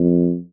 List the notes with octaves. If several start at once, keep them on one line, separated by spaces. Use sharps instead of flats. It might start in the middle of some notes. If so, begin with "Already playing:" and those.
Already playing: F2